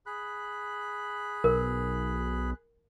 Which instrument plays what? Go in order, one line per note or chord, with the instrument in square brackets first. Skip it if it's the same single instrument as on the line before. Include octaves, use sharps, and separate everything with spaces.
[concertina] G#4 B5 F#6
[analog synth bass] B1 [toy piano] A#4